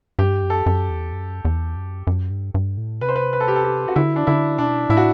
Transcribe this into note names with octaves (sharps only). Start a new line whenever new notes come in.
G2 G4
F#2
A4
F#2
E2
F#2
E2
F#2
F#2
G2
G2
A2
C3 B4
C5
B4
B4
A4
G4
A4
G4
F#4
D3 E4
D4
D3 E4
B2 D4
A2 E4
F#4